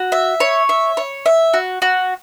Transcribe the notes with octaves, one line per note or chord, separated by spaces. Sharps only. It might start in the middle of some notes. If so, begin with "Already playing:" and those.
Already playing: F#4
E5
C#5
E5
C#5
E5
F#4
F#4